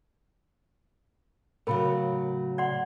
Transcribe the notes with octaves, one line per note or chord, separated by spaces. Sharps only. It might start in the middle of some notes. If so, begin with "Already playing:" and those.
A2 C#3 F#3 A#4 B5
D5 F#5 C6